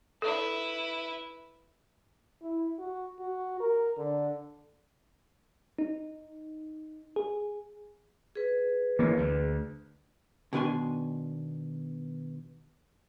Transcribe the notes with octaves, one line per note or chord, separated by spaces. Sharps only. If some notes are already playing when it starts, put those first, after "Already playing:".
E4 A4 B4
E4
F#4
F#4
A#4
D3
D#4
G#4
G#4 B4
E3 A#3
D2
B2 D#3 D4 G#5 C6